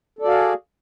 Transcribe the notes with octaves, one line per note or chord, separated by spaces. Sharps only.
F#4 G#4 A4 D5 F5